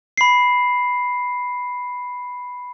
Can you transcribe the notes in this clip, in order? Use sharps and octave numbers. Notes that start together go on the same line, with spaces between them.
B5 C7